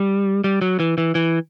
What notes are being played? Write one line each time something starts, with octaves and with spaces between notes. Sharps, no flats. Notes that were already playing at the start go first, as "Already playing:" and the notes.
Already playing: G3
G3
F#3
E3
E3
E3